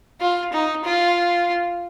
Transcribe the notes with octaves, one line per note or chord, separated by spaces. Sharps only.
F4
D#4
F4